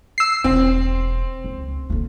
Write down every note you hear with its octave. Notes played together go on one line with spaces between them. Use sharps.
E6 C7
E1 C4
C#2
D3 A#3